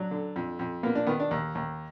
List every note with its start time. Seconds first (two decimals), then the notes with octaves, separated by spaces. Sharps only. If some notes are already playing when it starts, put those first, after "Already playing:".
Already playing: F#3 D4
0.11 D3
0.36 F2
0.59 F2
0.83 A#3 B3
0.95 D4
1.07 D#3 B3
1.20 D4
1.31 D#2
1.55 D#2